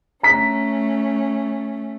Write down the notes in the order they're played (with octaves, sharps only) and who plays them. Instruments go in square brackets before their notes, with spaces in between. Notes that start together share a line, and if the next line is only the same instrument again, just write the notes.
[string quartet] A3 C#4 [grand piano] A#5 B6